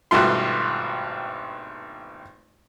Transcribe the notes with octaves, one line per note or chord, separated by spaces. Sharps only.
G#1 G2 B2 A3 F4 C6